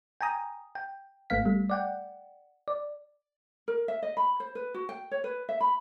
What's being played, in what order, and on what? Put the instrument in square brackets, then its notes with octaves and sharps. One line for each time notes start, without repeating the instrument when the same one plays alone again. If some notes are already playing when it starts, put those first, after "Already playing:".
[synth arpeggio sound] G5 G#5 A#5 D#6
G5
G#1 A3 B3 F5 B6
G3 A3
D5 F#5 G5
D5
[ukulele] A#4
E5
D#5
B5
C5
B4
F#4
G5
C#5
B4
E5
B5